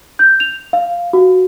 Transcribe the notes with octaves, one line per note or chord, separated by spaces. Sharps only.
G6
F7
F5
F#4